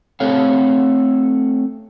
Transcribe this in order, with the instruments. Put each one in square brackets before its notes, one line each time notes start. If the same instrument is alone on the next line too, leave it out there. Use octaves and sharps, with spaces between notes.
[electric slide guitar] A3 C4 A4 C#5 F5